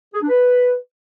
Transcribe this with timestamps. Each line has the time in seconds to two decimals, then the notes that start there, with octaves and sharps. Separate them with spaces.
0.14 G#4
0.22 D4
0.29 B4